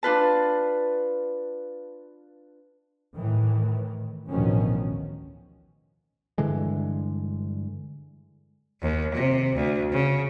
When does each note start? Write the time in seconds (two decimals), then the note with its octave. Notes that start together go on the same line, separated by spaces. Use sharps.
0.03 D4 F4 B4 A5
3.15 A2 D#3 E3
4.29 A1 D2 B2 D#3 F3 C#4
6.38 G2 D3 E3 G#3
8.82 D#2
9.15 C3
9.55 D2
9.92 C#3